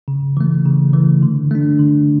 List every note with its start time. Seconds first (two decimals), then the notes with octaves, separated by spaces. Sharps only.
0.08 C#3
0.37 E3 A3
0.65 C#3
0.93 E3 A3
1.23 D3
1.51 A3 D4
1.79 D3